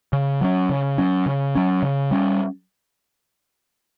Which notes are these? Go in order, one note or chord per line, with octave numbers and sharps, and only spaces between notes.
C#3
F#3 C#4
C#3
F#3 C#4
C#3
F#3 C#4
C#3
G3 C#4